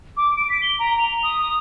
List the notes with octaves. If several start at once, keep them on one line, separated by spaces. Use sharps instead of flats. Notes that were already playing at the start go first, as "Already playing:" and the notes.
D6
D7
B6
G7
A#5
F7
D#6
D#6